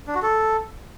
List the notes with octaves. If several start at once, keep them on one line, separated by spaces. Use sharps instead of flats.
D4
F#4
A4